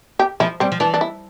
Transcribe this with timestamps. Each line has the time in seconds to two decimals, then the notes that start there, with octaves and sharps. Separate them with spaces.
0.19 G4
0.40 F3 E4
0.60 G3 C4
0.72 F3
0.80 E3 D4
0.94 D4
1.01 E4